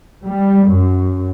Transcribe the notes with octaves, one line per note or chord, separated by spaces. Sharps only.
G3
F#2